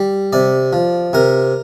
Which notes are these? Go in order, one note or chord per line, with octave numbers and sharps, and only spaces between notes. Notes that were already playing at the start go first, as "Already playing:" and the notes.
Already playing: G3
C3 D5
F3
C3 A#4